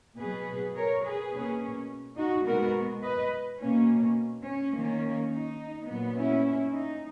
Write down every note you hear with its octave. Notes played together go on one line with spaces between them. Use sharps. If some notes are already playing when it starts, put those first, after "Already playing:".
B2 F#3 B3 G#4 B4
A#4 C#5
G#4 B4
B2 A#3 C#4
D#4 F#4
B2 G#3 B3 F#4 A#4
B4 D#5
B2 A#3 C#4
C#4
D#3 A#3 C#4
D#4
A#2 F#3 B3
C#4 E4
D#4